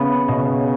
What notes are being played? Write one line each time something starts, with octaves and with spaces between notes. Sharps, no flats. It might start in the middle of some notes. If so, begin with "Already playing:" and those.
Already playing: C#3 B3
B2